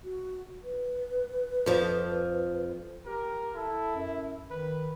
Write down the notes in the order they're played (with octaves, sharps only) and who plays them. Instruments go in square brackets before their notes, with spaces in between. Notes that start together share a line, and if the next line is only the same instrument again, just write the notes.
[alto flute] F#4
B4
[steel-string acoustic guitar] F2 F3
[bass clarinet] G4 [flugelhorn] A#4
[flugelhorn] E4 [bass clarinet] A4
[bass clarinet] F#2
[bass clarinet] D#3 [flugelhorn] B4